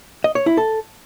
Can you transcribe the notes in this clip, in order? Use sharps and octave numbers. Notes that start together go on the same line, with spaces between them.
D#5
C#5
E4
A4